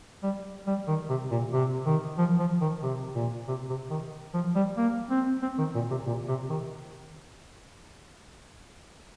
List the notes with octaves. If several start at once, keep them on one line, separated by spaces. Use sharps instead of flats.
G3
G3
D#3
C3
A#2
C3
D#3
F3
F3
D#3
C3
A#2
C3
C3
D#3
F3
G3
A#3
C4
C4
D#3
A#2
C3
A#2
C3
D#3